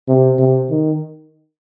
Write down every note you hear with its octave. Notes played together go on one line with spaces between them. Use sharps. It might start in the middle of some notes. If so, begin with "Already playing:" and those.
C3
C3
D#3